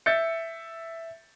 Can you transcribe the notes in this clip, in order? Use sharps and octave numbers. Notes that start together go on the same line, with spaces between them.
E5 G6 A6 C#7